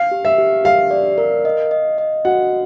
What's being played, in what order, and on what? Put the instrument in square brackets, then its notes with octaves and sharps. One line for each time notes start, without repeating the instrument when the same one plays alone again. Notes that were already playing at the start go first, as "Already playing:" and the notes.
Already playing: [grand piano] F5
[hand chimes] G4
[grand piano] E5
[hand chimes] G4
[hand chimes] G4 [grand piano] F5
[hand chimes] D5
A#4
D#5
D#5
D#5
[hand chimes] F#4 [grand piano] F#5